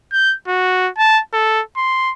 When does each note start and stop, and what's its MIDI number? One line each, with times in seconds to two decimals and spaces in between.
0.13 0.36 91
0.48 0.89 66
0.98 1.21 81
1.34 1.62 69
1.77 2.13 84